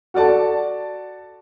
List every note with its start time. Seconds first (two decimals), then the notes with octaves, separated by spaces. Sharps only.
0.14 F#4 A4 D5 A5